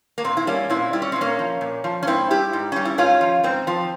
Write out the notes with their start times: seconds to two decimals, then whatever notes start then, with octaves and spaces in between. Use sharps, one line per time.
0.18 A#3
0.24 A#2 C4
0.37 E4
0.47 G3 A#3 C#4
0.69 A#2 C4 E4
0.93 G3 E4
1.02 C#4
1.12 A#2 C4
1.21 A#3 C#4
1.39 F3
1.61 A#2
1.84 F3
2.03 C#4
2.07 G#2 C4 E4
2.30 G3 E4 G4
2.53 G#2
2.72 G3 C#4
2.85 E4
2.98 G#2 C#4 F4
3.21 F3
3.44 G#2 C4
3.67 F3